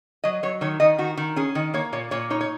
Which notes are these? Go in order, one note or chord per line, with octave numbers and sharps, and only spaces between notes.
F#3 D#5
F#3 C#5
D#3 C#5
D#3 D#5
D#3 F#4
D#3
C#4 G#4
D#3
A#3 C#5
A#2 C#5
A#2 C#5
D#4 C#5
C#5